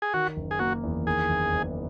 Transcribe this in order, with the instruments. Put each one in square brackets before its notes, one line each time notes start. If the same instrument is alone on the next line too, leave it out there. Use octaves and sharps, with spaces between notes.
[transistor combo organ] G#4
[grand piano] D#3 [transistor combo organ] F#4
[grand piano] F#1
[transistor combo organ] G#4
[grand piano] A#3 [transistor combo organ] F#4
[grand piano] E2
[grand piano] D#3 [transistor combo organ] G#4
[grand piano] F#1
F#1